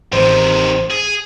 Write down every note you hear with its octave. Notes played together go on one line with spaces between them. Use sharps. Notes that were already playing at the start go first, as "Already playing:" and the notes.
A1 C3 D#3 C5
G#4